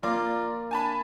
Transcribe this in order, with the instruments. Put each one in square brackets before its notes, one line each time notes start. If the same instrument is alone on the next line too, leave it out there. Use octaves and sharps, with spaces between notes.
[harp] A#3 [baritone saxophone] F4 [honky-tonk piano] D5 D6
[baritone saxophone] D4 [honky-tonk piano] G#5 A5 B5